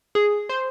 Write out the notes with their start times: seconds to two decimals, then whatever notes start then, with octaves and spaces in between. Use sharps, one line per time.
0.15 G#4
0.49 C5